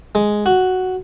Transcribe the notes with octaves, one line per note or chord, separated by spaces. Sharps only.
G#3
F#4